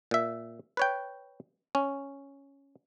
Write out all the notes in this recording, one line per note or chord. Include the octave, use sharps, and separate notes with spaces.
A#2 E5
B4 C#5 G5
C#4